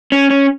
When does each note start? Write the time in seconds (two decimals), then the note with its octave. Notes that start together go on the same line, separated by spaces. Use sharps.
0.12 C#4
0.30 C#4